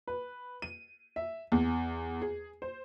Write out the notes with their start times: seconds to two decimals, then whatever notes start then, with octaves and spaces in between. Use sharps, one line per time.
0.08 B4
0.62 D#7
1.16 E5
1.52 E2
2.22 G#4
2.62 C5